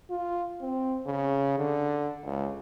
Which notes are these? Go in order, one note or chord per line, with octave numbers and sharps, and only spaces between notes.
F4
C4
C#3
D3
C#2